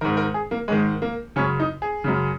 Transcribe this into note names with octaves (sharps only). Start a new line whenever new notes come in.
G#2 D#3 A#4
A#4
G#4
A#3
G#2 D#3 G#3
A#3
F#2 C#3 C#4
D#4
G#4
F#2 C#3